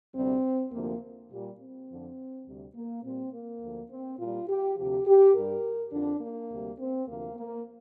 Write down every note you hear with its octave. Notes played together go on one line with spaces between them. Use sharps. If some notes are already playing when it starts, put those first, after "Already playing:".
D2 C3 G3 C4
D2 C3 F3 A#3
A#2 G3
C4
F2 D3 F3
D2 C3 G3
A#3
A#2 G3 C4
A#3
D2 D3 F3
C4
A#2 G3 F4
G4
D2 C3 F3 G4
G4
G2 G3 A#4
F2 D3 F3 D4
A#3
D2 C3 G3
C4
D2 C3 F3 A#3
A#3